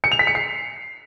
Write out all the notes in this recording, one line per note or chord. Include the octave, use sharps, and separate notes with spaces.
C#7
F7
B6
C#7
C7